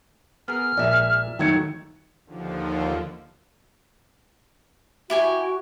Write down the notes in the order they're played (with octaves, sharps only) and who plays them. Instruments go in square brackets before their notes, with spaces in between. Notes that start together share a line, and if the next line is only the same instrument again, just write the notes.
[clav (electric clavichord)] B3 G#4 A#4 [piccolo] F6
[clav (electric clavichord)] A#1 A#2 G#3 [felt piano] D5 E5
[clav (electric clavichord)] F2 F#3 A3 [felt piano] D#3 G#6 C#7
[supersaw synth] D#2 D3 F3
[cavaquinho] E4 G4 G#5 [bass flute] F#4